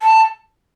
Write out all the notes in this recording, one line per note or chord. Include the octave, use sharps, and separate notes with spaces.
A5